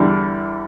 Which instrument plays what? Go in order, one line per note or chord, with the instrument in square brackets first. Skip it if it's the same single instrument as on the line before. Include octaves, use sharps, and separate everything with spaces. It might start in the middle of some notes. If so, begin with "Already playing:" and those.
Already playing: [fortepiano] E2 D3 G3